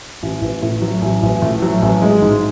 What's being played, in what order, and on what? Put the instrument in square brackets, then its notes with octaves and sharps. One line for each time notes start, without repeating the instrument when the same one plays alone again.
[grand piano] A1
A1
A2
F#3
A1
A1
A2
F#3
A1
G#3
G#2